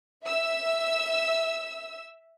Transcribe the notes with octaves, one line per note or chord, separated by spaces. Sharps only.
E5 E6